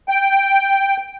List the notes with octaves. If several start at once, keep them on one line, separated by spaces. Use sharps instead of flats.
G5